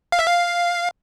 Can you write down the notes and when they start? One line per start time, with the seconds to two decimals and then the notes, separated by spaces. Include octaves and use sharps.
0.12 F5
0.19 E5
0.26 F5